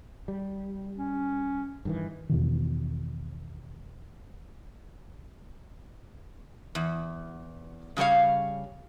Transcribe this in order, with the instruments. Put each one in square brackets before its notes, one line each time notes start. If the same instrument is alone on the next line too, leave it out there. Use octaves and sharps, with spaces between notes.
[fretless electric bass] G3
[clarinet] C#4
[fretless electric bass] G2 D#3 E3
[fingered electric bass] E2 B2 D#3
[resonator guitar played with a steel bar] E2
C#3 G3 A3 C#5 F5